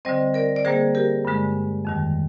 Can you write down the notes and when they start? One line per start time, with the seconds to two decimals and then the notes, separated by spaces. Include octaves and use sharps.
0.05 D3 G3 C4 C5 D#5
0.34 A#4 D5
0.56 D5
0.65 D3 G3 A#3 G#4 C5
0.95 G4 A#4
1.25 G2 D3 G#3
1.85 F2 D#3 G3